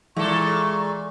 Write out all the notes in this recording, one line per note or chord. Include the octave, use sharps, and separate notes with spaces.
A#2 E3 G#3 A4 C#6